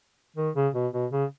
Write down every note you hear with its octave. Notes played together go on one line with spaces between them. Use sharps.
D#3
C#3
B2
B2
C#3